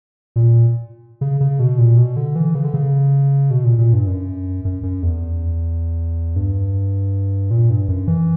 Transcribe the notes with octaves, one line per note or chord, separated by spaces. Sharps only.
A#2
C#3
C#3
B2
A#2
B2
D3
E3
C#3
D3
C#3
B2
A#2
A#2
G2
F#2
F#2
F#2
E2
G2
A#2
G2
F#2
E3